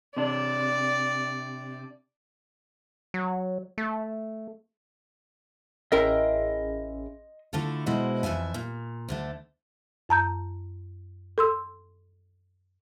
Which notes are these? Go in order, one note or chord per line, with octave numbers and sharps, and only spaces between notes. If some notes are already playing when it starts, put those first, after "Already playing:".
C3 D4 D5
F#3
A3
A1 C#4 E4 G#4 A#4 D#5 G5 C6
D3 A3 E4 F4 A4
B2 G#3 E4 F#4 C5 D#5
F2 E3 F3 E5 G#5
A#2
D2 D3 A3
F#2 A5 A#5 G6
A4 C6 E6